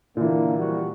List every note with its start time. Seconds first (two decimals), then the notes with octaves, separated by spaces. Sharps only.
0.17 A#2 D3 E3 A#3
0.58 F3 G3 F#4